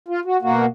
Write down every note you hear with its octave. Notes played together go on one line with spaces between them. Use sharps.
F4
F#4
B2 A#3 F#4